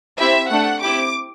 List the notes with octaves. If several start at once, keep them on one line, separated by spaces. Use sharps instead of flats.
C4 E4 G4 E5
A3 D4 A4 F#5
C4 E4 G4 D6